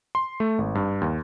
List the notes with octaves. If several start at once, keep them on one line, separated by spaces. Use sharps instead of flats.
C6
A3
G#1
G2
D#2